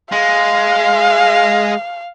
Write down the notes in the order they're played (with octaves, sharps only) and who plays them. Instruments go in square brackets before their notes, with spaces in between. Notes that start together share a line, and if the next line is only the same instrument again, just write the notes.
[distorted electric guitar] G#3 [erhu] F5